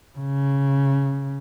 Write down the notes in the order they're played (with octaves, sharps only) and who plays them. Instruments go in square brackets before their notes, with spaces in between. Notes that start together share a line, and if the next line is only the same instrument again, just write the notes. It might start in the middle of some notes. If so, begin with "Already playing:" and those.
[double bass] C#3